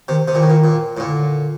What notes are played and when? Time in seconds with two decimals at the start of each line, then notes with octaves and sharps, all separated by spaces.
0.08 C3 D#3
0.27 C3 D#3
0.35 A#2
0.43 A2
0.50 A#2
0.64 A#2
0.97 A2
1.00 A#2 D3